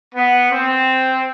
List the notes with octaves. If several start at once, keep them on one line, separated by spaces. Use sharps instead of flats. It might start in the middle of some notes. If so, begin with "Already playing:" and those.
B3
C4